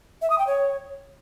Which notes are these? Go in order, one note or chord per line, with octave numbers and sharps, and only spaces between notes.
E5
D#6
G5
C#5